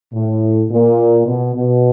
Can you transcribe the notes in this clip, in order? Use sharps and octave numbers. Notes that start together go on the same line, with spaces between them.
A2
A#2
B2
B2